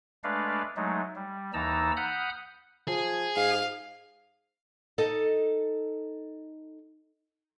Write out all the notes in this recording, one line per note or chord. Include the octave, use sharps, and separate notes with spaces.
G#3 A3 D4 B4 D5 F5
F#3 G#3 A3 D#4
G3
D#2 E3 D#4 A5 A#5 E6
F#5 B5 D#6 F6 G6
F3 G#4
G#2 F5
D#4 A4 D#5